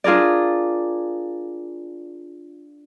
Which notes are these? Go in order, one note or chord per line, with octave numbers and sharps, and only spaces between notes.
D4 F4 G#4 A#4 D5